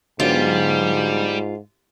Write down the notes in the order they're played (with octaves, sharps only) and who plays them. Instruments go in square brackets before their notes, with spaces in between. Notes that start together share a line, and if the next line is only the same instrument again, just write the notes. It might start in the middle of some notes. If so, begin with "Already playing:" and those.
[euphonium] G#2 [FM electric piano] D3 F#3 B3 [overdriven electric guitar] G3 [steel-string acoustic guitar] F4